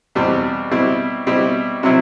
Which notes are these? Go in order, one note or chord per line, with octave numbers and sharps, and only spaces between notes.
E2 B2 G3 C4
B2 G3 C4 E4
B2 G3 C4 E4
C3 F#3 C4 E4